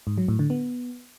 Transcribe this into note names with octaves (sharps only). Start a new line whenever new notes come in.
G#2
F#3
A2
D3
B3